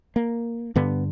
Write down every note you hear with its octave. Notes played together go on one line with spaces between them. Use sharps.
A#3
G2 D3 B3